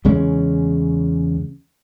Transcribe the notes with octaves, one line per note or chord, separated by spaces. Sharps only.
E2 C#3 G#3 C#4